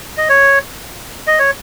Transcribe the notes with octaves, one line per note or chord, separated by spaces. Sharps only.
D#5
C#5
D#5
C#5